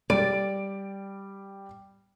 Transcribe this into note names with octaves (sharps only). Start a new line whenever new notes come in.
G3 D5 D7